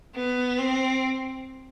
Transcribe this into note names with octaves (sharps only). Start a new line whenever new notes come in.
B3
C4